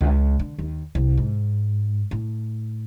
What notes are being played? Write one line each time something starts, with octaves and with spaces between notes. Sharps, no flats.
C#2
D3
D#2
C2
G#2
A2